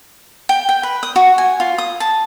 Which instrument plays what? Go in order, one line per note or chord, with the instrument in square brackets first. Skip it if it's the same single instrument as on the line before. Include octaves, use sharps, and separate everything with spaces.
[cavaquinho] G5
G5
B4
D#6
F#4
G#5
F4
D#6
A5